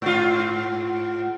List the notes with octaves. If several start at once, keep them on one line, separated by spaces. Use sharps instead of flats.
G#2 F4